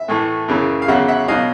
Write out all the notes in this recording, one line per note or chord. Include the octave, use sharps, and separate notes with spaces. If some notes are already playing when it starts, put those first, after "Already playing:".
Already playing: E5
A2 E3 A3
F#2 C#3 E3
F5
E2 C#3 F#3 E5 F#5
E5 F#5
B2 F#3 D#5 F5